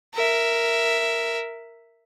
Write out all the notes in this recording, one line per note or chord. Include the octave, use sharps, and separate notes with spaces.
A#4 E5